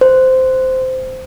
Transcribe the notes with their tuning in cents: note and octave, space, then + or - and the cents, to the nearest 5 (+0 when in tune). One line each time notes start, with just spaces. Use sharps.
C5 -10